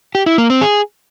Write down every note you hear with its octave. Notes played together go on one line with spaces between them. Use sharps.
G4
E4
A#3
C4
G#4